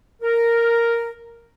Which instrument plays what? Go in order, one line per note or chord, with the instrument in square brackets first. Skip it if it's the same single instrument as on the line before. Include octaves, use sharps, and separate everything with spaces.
[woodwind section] A#4